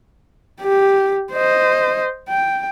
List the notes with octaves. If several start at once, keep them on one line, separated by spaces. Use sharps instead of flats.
G4
C5 D#5
G5